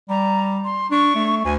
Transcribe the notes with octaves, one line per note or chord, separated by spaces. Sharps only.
G3 A#5
C6
D4 C#6
A3
D2 G#5